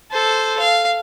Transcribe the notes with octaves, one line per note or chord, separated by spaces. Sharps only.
A4 C5
F5